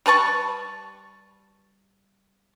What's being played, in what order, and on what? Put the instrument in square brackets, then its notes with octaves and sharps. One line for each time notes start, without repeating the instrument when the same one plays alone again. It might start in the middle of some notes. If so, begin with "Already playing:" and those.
[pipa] G3 B4 A5 C#6